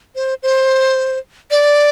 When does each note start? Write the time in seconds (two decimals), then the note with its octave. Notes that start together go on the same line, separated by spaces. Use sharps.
0.15 C5
0.43 C5
1.51 D5